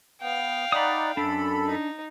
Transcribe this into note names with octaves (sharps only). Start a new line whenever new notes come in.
B3 F5 G5
D#4 D5 F#5 B5 D#6
F#2 D4 A4 B5
D#4